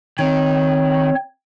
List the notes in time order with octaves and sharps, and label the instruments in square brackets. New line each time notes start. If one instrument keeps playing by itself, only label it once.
[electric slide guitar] D#3 [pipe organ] C4 C#5